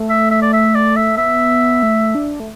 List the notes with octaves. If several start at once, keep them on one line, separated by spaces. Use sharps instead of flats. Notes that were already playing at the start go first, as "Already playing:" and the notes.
Already playing: A3
E5
E5
D5
E5
D5
E5
B3 E5
A3
D4
A3